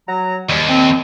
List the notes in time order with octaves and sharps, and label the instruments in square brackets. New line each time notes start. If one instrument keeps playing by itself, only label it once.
[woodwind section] F#3 A#5
[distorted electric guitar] D#2 [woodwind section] G3
[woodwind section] C4